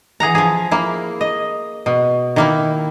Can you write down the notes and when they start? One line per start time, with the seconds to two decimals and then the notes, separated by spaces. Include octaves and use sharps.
0.20 E3 G#4 F#5 A#5
0.35 F3 G#4
0.71 A#3 E4
1.21 D#5
1.86 B2
2.36 D#3 A#3 E4